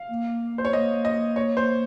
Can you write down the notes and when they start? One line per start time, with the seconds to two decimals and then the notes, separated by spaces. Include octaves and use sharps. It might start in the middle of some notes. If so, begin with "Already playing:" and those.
Already playing: F5
0.09 A#3
0.58 C5
0.65 C#5
0.72 A#3 D#5
1.05 D#5
1.36 C#5
1.57 C5